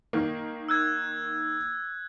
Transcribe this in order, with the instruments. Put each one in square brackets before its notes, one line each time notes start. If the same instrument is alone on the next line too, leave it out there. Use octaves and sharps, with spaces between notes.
[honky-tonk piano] D#3 A#3
[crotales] E6 F#6 G#6